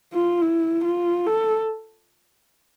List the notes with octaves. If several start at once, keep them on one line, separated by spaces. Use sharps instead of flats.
F4
E4
F4
A4